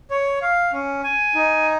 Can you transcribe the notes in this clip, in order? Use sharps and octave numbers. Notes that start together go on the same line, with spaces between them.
C#5
F5
C#4
G#5
D#4